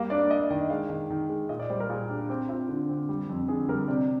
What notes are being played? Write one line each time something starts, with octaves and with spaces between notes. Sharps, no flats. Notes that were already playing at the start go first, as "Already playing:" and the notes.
Already playing: G3 A#3 F5
D4 D5
A#3 D#5
D#3 D#5
G#3 F5
D#3
D#3
G#3
A#2 D#5
D5
G3 C5
A#4
A#2 G#4
D4 G4
C4 G4
C4 F4
D3
C4
G3
F2
D3 G#4
G3 A#4
C3 D5